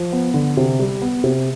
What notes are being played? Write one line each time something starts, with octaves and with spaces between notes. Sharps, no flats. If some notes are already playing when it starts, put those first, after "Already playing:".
Already playing: F3
B3
D3
C3
G3
B3
C3